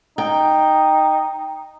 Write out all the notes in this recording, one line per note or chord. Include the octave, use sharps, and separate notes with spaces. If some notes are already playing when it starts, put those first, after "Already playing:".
D#4 G5